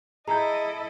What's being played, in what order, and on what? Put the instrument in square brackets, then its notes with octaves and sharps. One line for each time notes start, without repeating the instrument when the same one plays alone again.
[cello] E4 A4 [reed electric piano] G#4 [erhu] D#5 [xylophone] A#5 G6